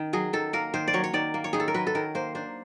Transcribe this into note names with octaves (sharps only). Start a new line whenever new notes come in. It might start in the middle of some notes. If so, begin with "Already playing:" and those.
Already playing: D#3
F#3 G#4
D#3 A4
A#3 A#4
D#3 C5
D5
F#3 C#5
C#5
D#3 D5
A#3
C#5
D#3 G#4
A4
A#4
F#3 B4
A4
D#3 A#4
A#3 C5
D4 C5